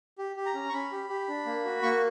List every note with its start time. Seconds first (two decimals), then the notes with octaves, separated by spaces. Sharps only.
0.18 G4
0.36 G4
0.46 A#5
0.54 C#4
0.69 C#6
0.73 C#4 B5
0.92 G4
1.09 G4
1.28 D4
1.46 A#3
1.65 F#4
1.83 A#3 C#6